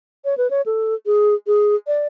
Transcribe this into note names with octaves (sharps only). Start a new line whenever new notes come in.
C#5
B4
C#5
A4
G#4
G#4
D5